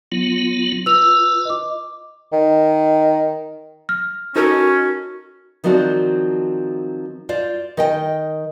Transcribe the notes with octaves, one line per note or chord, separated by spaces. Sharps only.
F#3 B3 F4
F4 B4 E6 F7
D#5 D6
D#3
F6
C#4 D#4 F#4 A4 A#4
D#3 F3 F#3 C4 F#4 D5
F4 C5 D5
D#3 D#5 G5